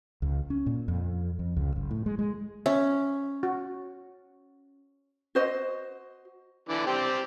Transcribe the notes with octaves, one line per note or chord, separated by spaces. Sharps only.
C#2
C#4
A#2
F2
F2
C#2
F#1
A2
G#3
G#3
C#4 E5
F#4
F#4 C5 D#5
D3 E3 D5
C4 G4 D5